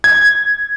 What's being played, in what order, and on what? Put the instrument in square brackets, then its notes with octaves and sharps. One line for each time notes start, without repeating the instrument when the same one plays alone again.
[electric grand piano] G#6